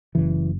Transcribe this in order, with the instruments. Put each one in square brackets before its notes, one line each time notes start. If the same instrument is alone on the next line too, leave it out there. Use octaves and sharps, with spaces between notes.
[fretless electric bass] F#1 F#2 C#3 E3